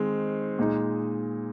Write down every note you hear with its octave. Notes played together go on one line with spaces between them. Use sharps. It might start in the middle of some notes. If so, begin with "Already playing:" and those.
Already playing: D#3 G#3 C4
A#2 G#3 D#4